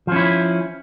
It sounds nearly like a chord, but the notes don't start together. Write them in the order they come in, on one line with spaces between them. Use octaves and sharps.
F3 C#4 E4